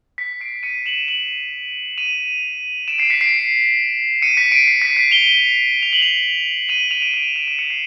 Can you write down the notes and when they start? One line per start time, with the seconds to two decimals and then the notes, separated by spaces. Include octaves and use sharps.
0.18 B6 C#7
0.41 C7 D7
0.63 C#7 D#7
0.86 E7 F#7
1.08 E7 F#7
1.98 D#7 F7
2.88 D7 E7
2.98 C7 D7
3.10 B6 C#7
3.21 C7 D7
4.22 C#7 D#7
4.37 B6 C#7
4.52 C7 D7
4.68 C7
4.82 B6
4.96 B6 C#7
5.11 F7 G7
5.83 F7
5.93 F#7
6.01 F7 G7
6.69 D#7 F7
6.91 D#7 F7
7.02 D7 E7
7.14 D7 E7
7.36 D7 E7
7.47 C7 D7
7.58 B6 C#7
7.70 C7